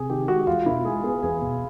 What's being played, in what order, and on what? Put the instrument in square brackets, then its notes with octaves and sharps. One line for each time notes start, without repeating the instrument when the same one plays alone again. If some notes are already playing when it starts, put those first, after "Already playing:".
Already playing: [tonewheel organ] C3 [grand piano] G#4
[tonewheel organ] D#3 [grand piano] G4
[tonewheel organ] G#3 [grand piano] F#4
[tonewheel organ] E2 [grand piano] F4
[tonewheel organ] B2 [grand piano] E4
[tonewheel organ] G#3 [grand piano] G#4
[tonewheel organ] B3 [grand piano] G#4
[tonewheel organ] E2 [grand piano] G#4
[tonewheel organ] B2